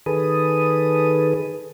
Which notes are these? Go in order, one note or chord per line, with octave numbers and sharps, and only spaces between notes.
D#3 G#4 A4 B4 D#6